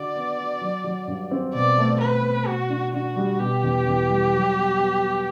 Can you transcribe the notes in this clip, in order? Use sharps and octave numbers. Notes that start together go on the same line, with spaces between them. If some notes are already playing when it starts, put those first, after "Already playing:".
Already playing: D3 F#4 D5
B3
F#4
F#3
F#3
G2
C4
B2 D5
A3
A3 B4
B2
B2 F#4
D4
D4 F#4
G3
B2 G4
E2
E2
G3
F#3
B3
B3
B3